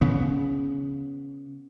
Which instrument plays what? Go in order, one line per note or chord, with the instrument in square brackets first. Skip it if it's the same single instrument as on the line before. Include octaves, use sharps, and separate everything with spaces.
[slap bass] C#3 B3